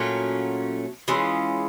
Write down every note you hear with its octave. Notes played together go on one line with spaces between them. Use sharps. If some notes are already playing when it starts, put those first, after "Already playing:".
Already playing: A#2 F#3 A3 C#4
E3 G#3 C#4 F4